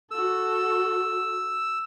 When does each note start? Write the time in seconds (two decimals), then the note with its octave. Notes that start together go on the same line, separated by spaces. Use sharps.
0.11 F#4 A4 E6